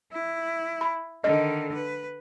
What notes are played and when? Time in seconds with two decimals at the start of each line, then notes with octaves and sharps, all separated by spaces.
0.12 E4
0.81 B5
1.24 D3 D#3 D#5
1.74 B4